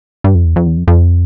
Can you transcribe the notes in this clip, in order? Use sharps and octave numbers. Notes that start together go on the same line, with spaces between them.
G2
F2
E2
F2
E2
F2
F2